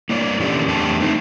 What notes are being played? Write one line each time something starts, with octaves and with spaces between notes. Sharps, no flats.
A#3 E4 C#5 D5
E3 C#4 D4 G4 A4 D5
E2 A3 C4 D4 G4 A5
A3 C4 D#4 A4